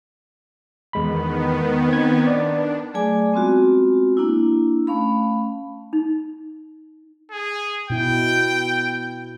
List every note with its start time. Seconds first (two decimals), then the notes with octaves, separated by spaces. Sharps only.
0.93 E2 D#3 G#3 B3 B5
1.89 C4 G#6
2.27 D4 D5
2.94 F#3 A3 G#4 D5 G#5 D6
3.33 G#3 B3 C4 F4 F#4
4.17 A#3 D4 E4
4.87 A3 C#4 F5 B5
5.93 D#4
7.31 G#4
7.90 B2 E4 G5